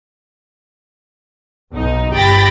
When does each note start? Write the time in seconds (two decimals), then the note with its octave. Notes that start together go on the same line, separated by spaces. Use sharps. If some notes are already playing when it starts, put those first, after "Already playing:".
1.74 B1 D#4
2.14 G1 G4 G5 B5 A6 A#6